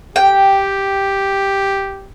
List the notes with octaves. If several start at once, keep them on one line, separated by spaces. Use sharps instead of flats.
G4 G5